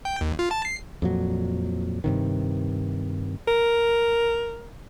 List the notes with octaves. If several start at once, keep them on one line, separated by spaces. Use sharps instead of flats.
G5
D#2
F4
A5
C7
F2 A#2 F#3
G2 C3 D#3
A#4